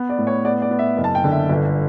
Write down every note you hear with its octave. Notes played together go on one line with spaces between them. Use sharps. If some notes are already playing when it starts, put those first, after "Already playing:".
Already playing: B3
D5
A2
C#5
B3 D5
D5
B3
E5
F#1
A5
G5
D3
E5
G1